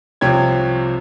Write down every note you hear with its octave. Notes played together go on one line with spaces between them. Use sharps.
C2 C3 F3 C4 C#5 G#6